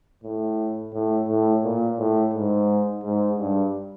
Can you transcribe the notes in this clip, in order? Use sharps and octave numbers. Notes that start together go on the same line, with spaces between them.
A2
A2
A2
A#2
A2
G#2
G#2
G2